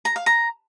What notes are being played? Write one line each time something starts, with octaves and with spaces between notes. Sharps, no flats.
A#5
F5
A#5